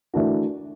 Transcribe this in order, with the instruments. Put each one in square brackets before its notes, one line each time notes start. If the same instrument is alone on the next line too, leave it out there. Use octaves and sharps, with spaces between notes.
[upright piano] E3 A3 D4 F#4 A#4